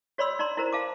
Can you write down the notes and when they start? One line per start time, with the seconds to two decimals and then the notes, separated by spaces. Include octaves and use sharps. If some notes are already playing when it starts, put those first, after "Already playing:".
0.18 F#4 C#5 D5 B5 C6 E6
0.39 D#4 D5 A#5 C6
0.57 E4 F#4 A#4 C5 A#5
0.73 F5 A5 D6